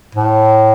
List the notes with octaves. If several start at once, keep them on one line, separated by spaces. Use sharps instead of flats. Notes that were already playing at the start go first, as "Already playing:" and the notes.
A2